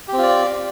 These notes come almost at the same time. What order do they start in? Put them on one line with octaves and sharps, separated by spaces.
G4 C4 F4 D5